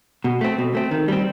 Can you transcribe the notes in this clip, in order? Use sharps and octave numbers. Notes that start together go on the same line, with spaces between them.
B2
A3 C4
B2
A3 C4
D#3
G3 C4